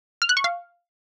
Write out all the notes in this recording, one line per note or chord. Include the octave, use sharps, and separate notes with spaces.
F6
F#6
C#6
F5